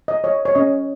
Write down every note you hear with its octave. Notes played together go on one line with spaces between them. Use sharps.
D#5
C#5 D#5
C#5
C#4 D#5